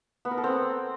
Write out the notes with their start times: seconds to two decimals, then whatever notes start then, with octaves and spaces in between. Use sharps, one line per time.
0.25 B3
0.31 A#4
0.37 A4
0.44 C4